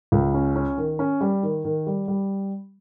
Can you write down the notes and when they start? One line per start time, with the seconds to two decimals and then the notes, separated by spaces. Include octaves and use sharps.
0.12 C#2
0.34 C#4
0.56 C#4
0.77 D#3
0.99 C#4
1.21 G3
1.43 D#3
1.64 D#3
1.87 G3
2.08 G3